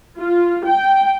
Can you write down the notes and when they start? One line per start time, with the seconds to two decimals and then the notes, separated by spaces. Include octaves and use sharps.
0.19 F4
0.67 G5